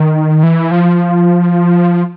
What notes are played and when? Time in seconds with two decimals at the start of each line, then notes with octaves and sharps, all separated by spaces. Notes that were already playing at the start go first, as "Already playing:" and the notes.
Already playing: D#3
0.43 E3
0.71 F3